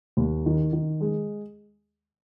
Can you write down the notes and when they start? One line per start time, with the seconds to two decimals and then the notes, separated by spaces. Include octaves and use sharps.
0.17 D#2
0.46 D#3
0.73 D#3
1.01 G#3